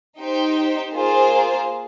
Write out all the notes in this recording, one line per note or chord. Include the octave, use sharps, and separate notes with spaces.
D#4 G4 C5 G5
A#3 F4 G#4 C5